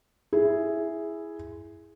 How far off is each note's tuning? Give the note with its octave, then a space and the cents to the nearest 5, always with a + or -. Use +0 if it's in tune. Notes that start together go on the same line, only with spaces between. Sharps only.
E4 +0 G#4 +0